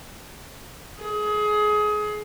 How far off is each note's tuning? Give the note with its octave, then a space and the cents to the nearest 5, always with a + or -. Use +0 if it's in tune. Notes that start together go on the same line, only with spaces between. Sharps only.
G#4 +25